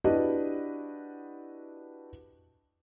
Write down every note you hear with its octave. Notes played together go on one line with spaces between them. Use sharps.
D4 E4 F#4 G4 B4 D#5